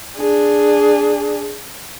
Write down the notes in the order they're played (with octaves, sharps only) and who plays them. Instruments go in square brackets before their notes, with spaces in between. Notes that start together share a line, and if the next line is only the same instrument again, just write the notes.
[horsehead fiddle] D4 G#4